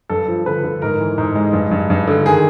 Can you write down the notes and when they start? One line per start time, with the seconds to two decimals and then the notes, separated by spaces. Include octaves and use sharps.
0.09 G2 A4
0.28 F3
0.46 D3 B4
0.64 D3
0.82 G#2 A#4
1.00 E3
1.18 G#2
1.36 G#3
1.53 G2
1.71 G2
1.90 G2
2.08 D3
2.26 D#3 G#4